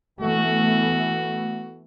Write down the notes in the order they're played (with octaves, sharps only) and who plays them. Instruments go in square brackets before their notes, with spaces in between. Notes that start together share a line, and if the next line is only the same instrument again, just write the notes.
[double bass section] E3 A3 B3 [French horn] F#4